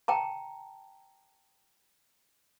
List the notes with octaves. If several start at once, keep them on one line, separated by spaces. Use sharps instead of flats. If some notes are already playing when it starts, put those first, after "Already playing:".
G5 A5 A#5